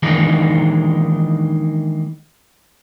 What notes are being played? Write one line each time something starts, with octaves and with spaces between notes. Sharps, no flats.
D#3 E3 G#3 A#3 D4 D#4